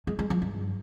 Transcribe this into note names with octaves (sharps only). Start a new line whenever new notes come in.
G#3
G#3
F3
G2